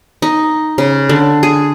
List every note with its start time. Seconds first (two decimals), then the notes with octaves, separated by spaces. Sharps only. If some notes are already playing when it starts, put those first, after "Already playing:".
0.22 D#4
0.78 C#3
1.09 D3
1.43 G#4